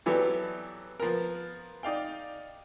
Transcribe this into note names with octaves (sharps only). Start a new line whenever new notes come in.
E3 F#3 B3 G4 A4 D5
F3 B3 A#4
D#4 D5 F5 G5